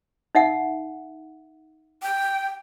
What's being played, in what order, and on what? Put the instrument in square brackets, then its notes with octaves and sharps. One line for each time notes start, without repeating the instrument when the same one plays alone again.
[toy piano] D#4 E5 F#5
[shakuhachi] G5